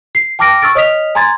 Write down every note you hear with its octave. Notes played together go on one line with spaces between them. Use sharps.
C7
G5 A5 D6 F6 A#6 D7
C#6 E6 F6 A6 D7
C#5 D#5 D#6 F6 B6 F7
G#5 A#5 C6 G#6 A6